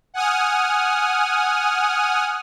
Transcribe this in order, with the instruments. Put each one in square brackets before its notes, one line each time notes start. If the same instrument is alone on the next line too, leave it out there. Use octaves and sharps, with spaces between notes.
[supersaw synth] F#5 G#5 D#6 F6